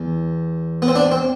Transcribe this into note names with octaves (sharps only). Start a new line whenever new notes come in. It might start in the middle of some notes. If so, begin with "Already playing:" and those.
Already playing: E2
B3
C4
D4
C4